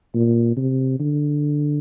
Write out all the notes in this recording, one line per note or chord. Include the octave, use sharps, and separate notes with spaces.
A#2
C3
D3